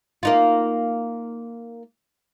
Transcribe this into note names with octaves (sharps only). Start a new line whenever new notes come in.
A#3 D#4 F4